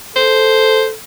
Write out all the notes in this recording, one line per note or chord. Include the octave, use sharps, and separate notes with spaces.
A4 C5